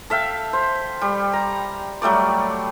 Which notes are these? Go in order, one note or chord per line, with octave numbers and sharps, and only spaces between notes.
A4 E5 F5 G5
C5
G3
A#5
F#3 G3 A3 D5